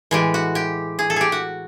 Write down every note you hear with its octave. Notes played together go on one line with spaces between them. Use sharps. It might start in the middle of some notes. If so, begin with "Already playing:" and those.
A2 E3 G#3 G4
F#4
G4
G#4
A4
G4 G#4
F#4